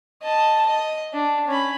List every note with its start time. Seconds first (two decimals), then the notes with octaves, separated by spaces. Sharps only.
0.23 D#5 A5
0.67 D#5
1.14 D4
1.48 C#4 B5